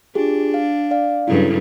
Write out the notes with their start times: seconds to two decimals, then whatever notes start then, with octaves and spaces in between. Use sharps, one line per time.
0.15 D4 F4 G4 G#4
0.54 F5
0.91 D5 F5
1.28 G2 C#3 F#3 E4 A4